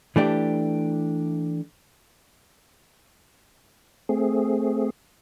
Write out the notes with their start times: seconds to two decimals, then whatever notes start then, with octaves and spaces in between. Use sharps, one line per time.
0.16 E3 A3 D4 G4
4.09 A3 C4 G#4